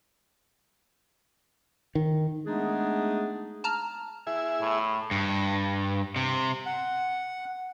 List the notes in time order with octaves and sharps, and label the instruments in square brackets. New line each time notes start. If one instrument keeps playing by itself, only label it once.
[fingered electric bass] D#3
[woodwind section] G#3 A3 B3 D4 D#4 G#4
[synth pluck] A5 A#5 F6
[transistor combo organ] E4 G#4 E5
[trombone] A2
[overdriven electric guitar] G2
C3
[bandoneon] F#5